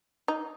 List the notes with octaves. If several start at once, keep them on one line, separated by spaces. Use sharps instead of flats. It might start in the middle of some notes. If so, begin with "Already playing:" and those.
D#4